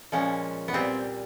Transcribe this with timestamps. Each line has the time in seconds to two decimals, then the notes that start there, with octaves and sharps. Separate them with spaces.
0.12 A#2 F3 G#3 C#4
0.68 B3
0.73 A#2 G3 C4